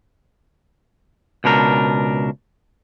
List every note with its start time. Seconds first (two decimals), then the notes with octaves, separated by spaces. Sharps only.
1.44 C#2 B2 D4 A#4